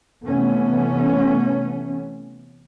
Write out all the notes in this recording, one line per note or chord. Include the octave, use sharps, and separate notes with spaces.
C3 E3 A3 B3 C#4